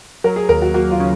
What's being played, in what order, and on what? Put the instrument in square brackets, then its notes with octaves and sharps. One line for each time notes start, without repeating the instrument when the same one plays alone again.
[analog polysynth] F#3 [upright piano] A#4
[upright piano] G#4
[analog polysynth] D#2 [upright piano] A#4
[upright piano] F#4
[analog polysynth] A#3 [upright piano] F#4
[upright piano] F4
[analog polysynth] C#3